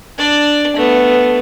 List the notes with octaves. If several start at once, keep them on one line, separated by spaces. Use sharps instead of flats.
D4 D5
A3 B3